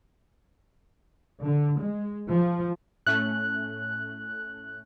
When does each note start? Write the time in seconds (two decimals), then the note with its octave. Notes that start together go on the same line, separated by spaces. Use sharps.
1.42 D3
1.78 G#3
2.29 F3
3.07 A2 A3 C#4 F#6